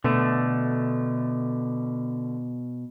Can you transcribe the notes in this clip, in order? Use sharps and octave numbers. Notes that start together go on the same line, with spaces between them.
B2 D3 A3